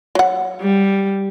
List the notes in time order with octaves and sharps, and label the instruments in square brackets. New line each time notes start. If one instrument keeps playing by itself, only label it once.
[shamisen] F#3 F#5
[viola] G3